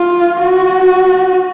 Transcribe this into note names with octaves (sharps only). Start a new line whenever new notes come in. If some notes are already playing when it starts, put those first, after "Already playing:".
Already playing: F4
F#4